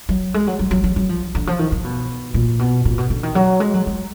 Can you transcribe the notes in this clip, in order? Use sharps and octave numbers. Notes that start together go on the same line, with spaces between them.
F#3
G#3
F#3
F#3
F#3
F#3
F#3
F3
D3
F3
D#3
D#3
B2
A#2
B2
A#2
B2
D3
D#3
F#3
G#3
F#3
G#3